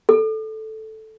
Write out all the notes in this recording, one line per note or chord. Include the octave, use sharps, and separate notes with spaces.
A4